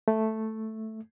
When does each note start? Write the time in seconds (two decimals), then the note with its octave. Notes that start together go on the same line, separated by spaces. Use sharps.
0.08 A3